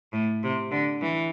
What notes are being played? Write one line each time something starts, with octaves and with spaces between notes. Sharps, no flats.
A2
C3
D3
E3